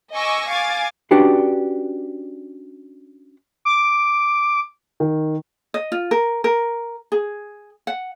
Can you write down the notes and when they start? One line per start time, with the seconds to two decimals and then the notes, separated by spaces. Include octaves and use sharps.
0.14 D#5 G#5 C#6 D6 E6 A#6
0.49 F5 G#5 D6 G#6 A6
1.11 C#4 D4 F#4 G4 B4 D5
3.65 D6
5.00 D#3
5.74 D#5
5.92 F4
6.11 A#4
6.44 A#4
7.12 G#4
7.87 F#5